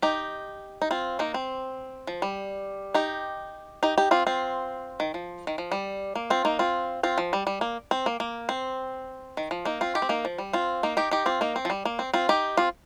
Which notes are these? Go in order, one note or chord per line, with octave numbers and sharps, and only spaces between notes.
D#4 G4
D#4
C4 F4
A#3 D#4
C4
F3
G3
D#4 G4
D#4 G4
D#4 G4
C4 F4
C4 F4
D#3
F3
D#3
F3
G3
A#3
C4 F4
A#3 D#4
C4 F4
C4 F4
F3
G3
G3
A#3
C4
A#3
A#3
C4
D#3
F3
A#3 D#4
C4 F4
D#4 G4
C4
A#3 D#4
F3
G3
C4 F4
A#3 D#4
D#4 G4
D#4 G4
C4 F4
A#3 D#4
C4
F3
G3
A#3
C4
C4 F4
D#4 G4
C4 F4